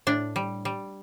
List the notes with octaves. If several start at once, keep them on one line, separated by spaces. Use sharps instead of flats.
A2 D4
G3
G3